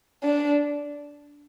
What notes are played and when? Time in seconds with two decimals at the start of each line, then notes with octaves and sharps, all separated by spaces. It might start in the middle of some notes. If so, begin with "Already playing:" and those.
0.23 D4